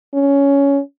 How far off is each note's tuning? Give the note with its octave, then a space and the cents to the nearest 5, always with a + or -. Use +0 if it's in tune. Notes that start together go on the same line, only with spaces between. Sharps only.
C#4 +10